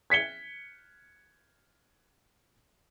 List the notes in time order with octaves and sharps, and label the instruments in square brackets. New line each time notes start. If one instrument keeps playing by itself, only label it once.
[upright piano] G#6 B6 C#7 G7